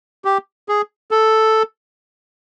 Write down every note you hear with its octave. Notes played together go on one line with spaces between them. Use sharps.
G4
G#4
A4